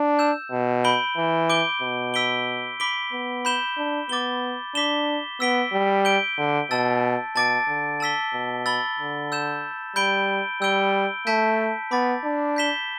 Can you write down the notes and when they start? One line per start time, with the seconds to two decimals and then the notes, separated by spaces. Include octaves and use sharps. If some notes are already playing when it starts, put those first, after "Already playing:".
Already playing: D4
0.19 E6 G6 E7
0.51 B2
0.84 B5 G6 D7 G7
1.17 E3
1.50 D6 G6 D7 G7
1.82 B2
2.14 E6 B6 D7 G7
2.80 B5 D6 B6 D7 G7
3.12 B3
3.45 B5 G6 E7 G7
3.77 D4
4.09 B3 D6 A6 G7
4.75 D4 D6 B6 E7 G7
5.40 B3 E6 B6 D7 G7
5.73 G3
6.05 G6 D7 G7
6.38 D3
6.71 B2 A5 E6 A6
7.36 B2 A5 D6 A6 D7
7.68 D3
8.00 A5 E6 B6 G7
8.33 B2
8.66 B5 E6 A6 G7
8.99 D3
9.32 E6 G6 E7
9.96 G3 B5 G6 D7 G7
10.61 G3 E6 G6 D7 G7
11.27 A3 A5 E6 G6 B6 D7
11.91 B3 B5 D6 A6
12.24 D4
12.56 G6 B6 E7 G7